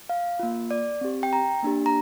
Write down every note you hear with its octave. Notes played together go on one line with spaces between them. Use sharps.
F5
A#3 F4
D5
C4 G4
G5
A#5
A#3 D4 G4
A#5